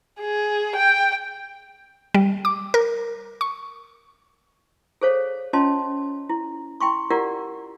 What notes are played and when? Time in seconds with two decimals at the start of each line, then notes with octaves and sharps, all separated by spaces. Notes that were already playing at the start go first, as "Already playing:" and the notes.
0.21 G#4
0.76 G5
2.14 G3
2.45 D6
2.74 A#4
3.41 C#6
5.01 G#4 A4 C5 C#5 F5
5.53 C#4 F4 C#5 D#5 A5 C6
6.29 E4
6.80 E4 G5 C6 C#6
7.10 E4 F4 G4 A#4 D5 F#5